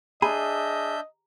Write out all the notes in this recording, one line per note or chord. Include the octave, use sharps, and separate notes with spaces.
D4 G#4 D#5 E5 A#5 G6